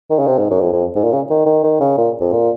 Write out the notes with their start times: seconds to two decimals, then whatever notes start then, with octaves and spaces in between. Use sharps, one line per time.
0.10 D#3
0.19 C#3
0.27 C3
0.39 G#2
0.50 F#2
0.61 F2
0.73 F2
0.95 G#2
1.04 A#2
1.12 C#3
1.30 D#3
1.46 D#3
1.64 D#3
1.80 C#3
1.98 A#2
2.20 F2
2.32 A#2